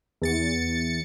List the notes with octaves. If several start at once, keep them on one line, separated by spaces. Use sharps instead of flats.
E2 A6 C#7